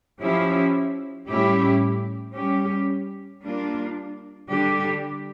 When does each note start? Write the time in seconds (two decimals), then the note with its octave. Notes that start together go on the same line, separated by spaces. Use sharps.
0.22 F3 C#4 E4 G4
1.28 A2 G3 C#4 E4 G4
2.35 G3 C#4 G4
3.43 G3 A#3 D4 F4
4.49 D3 G3 D4 G4